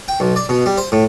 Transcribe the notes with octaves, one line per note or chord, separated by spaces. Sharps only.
G5
B1
D5
B2
G3
C5
A2